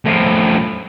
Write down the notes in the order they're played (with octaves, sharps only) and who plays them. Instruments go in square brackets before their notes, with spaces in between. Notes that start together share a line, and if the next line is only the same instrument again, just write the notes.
[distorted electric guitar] A2 F3